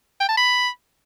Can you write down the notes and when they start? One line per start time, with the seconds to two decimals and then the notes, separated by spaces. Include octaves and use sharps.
0.20 G5
0.29 A5
0.37 B5